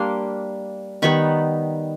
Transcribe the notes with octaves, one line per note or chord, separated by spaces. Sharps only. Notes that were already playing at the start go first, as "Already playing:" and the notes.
Already playing: G3 A#3 D4 C6 D6
D#3 G3 B3 D#4 B5 C#6